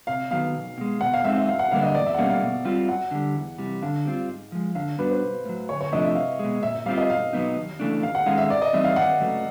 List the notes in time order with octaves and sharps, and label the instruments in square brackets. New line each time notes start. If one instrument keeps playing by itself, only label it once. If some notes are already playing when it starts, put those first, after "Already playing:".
[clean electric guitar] C3 [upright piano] F5
[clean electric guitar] D#3 F#3 B3 [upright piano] F5
[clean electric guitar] B1
B2 G#3
[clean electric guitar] B2 [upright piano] F#5
[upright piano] F5
[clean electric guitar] G#3 C4 D#4 [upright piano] E5
[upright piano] E5
[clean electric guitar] F#2 [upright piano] F5
[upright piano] F#5
[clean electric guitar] D3 G3 A#3 D4 [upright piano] F5
[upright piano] D#5
[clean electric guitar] E2 [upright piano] D5
[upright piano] E5
F#5
[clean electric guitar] B2 G3 A#3 C#4 [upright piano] F5
[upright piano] F5
[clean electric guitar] B2
G3 C4 F4
[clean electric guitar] F#2 [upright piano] F#5
[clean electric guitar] D3 G3
E2
C3 E3 G3
[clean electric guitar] D3 [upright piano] F5
[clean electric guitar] G3 C4 F4
G#2
F3 G#3
[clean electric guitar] D3 [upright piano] F5
[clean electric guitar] G3 B3 D4 F#4 [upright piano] B4
[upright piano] C5
[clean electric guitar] B1
A2 F#3
[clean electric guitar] D2 [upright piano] C#5
[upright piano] C#5
[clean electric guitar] C3 F3 A3 D4 [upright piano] D#5
[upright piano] E5
[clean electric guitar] C2 [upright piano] F5
[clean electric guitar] B2 G#3
[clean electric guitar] A#2 [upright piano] E5
[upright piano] E5
[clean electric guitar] G3 C4 F4 [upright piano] F5
[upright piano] D#5
[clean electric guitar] B1 [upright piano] F5
[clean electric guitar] B2 F#3 B3 D#4
D#2
C#3 E3 A3 D4
[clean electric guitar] D#2 [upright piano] F5
[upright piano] F#5
[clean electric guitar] D#3 G#3 C#4 [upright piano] F5
[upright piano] E5
[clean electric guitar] G#2 [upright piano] D5
[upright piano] D#5
[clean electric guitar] E3 G3 C4 D#4 [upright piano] E5
[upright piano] F5
[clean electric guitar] D#2 [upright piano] F#5
[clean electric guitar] C#3 F#3 A3